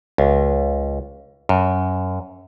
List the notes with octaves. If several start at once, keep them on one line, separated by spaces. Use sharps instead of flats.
C#2
F#2